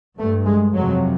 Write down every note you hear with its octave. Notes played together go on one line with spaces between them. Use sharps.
G2 A3
G#3
F2 C3 F#3